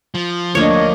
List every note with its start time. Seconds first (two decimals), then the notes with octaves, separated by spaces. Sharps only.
0.15 F3
0.55 D2 A#3 D4 C#5 D#5